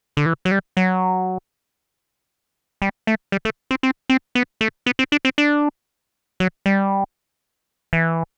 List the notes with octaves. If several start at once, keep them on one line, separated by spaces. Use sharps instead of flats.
D3
E3
F#3
G3
F#3
G3
A3
G3
A3
C4
C4
C4
B3
A3
B3
C4
D4
C4
D4
F#3
G3
E3